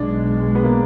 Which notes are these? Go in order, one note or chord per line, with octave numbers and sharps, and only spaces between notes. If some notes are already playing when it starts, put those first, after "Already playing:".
Already playing: B1 B2 G#3 D4
B3
A#3